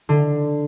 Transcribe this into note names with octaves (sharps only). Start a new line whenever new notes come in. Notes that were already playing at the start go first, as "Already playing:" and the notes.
D3